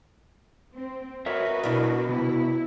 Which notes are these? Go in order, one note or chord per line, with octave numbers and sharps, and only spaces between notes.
C4
F#4 A#4 B4 C#5 D#5 E5
B2 D4 E4 A#4
C3 B3 E4